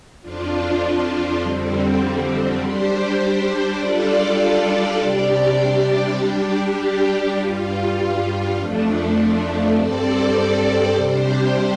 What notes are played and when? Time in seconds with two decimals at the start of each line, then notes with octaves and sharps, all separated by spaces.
0.22 F2 F3 D4 F4
1.40 F2 D3 G3 C4
2.60 G3 D4 G4 C5
3.79 G3 D4 F4 A4 D5
4.99 C3 G3 D4 G4 D5
6.17 G3 D4 G4
7.36 G2 G3 F4
8.56 F2 F3 A3 D4
9.76 G2 G3 C4 A4 D5
10.95 C3 G3 D4 G4 C5